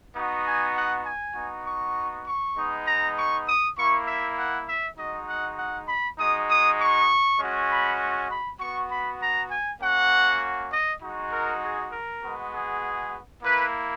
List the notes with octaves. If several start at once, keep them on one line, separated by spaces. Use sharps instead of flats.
B3 D#4 F#4
G#5
F#5
G#5
B3 D#4 F#4
C#6
C#6
G#3 B3 D#4
A#5
C#6
D#6
A#3 E4 C#6
E5
F#5
E5
G#3 D#4 F#4 D#5
F#5
F#5
B5
G#3 D#4 F#4 D#6
D#6
C#6
G#3 C#4 F#4
B5
B5
B3 F#4 C#6
B5
A#5
G#5
A#3 C#4 F#4 F#5
D#5
G#3 D#4 F#4
A#4
G#4
A#4
G#3 B3 F#4
G#4
A#3 E4 B4